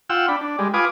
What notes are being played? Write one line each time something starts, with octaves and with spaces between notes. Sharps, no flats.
F4 F#5 G5 E6
D4 B5
D4
G3 G#3
F4 B4 G#5 D6 D#6